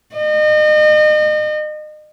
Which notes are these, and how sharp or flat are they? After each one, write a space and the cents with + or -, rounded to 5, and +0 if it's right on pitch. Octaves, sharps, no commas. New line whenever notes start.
D#5 -35